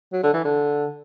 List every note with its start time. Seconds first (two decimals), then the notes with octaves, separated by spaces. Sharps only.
0.13 F#3
0.23 D3
0.34 E3
0.44 D3